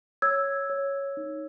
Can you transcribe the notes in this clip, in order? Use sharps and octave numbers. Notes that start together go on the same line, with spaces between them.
C#5 E6 G#6
C#5
D#4